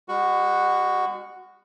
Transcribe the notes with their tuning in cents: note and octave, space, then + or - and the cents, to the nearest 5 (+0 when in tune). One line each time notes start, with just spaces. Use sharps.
G#3 -45 F#4 +0